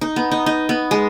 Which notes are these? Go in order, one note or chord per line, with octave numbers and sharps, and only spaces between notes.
D#4
B3
D#4
D#4
B3
G#3